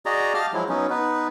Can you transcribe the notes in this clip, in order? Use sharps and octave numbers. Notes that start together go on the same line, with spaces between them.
F#4 G#4 D5 D#5 A#5
G4 D#5 F5 A5 F6
F3 F#3 G#3 E4
F#3 B3 C#4 D#4
B3 D#4 B4